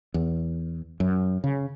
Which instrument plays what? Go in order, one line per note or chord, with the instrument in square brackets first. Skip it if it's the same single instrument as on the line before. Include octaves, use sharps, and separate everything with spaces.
[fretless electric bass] E2
F#2
C#3